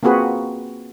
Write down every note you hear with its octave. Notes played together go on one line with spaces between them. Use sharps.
A#3 C4 F4 F#4 G#4 B4